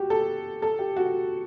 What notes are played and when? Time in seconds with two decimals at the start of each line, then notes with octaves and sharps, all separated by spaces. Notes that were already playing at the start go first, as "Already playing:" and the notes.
Already playing: F#4 G4
0.10 A4
0.62 A4
0.79 G4
0.97 F#4